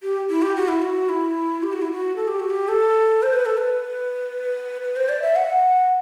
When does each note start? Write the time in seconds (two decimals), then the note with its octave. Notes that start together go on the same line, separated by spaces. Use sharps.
0.03 G4
0.30 E4
0.42 G4
0.56 F#4
0.68 E4
0.82 F#4
1.09 E4
1.63 G4
1.73 F#4
1.82 E4
1.92 F#4
2.16 A4
2.28 G4
2.40 F#4
2.51 G4
2.68 A4
3.23 C5
3.33 B4
3.46 A4
3.58 B4
4.82 B4
4.96 C5
5.09 D5
5.22 E5
5.36 F#5